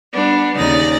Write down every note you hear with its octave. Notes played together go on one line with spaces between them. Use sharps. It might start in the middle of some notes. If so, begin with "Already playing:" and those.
G3 B3 D4
D#2 C#3 D#4 D5 A#6